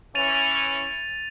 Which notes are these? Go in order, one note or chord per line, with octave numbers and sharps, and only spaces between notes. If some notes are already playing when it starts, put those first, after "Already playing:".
E3 C#4 A6 D#7 F7